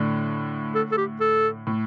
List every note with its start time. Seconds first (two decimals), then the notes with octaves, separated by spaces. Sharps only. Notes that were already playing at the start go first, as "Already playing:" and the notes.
Already playing: A2 D3
0.75 A4
0.92 A4
0.98 G4
1.20 A4
1.67 A2